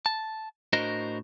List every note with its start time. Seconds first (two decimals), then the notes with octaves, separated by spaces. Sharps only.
0.06 A5
0.73 A2 D4 F#4 A#4 C5 D#5